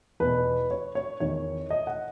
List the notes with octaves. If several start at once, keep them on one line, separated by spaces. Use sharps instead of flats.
E2 B2 B4
C#5
C#5
E2 D#3 C#5
D#5
F#5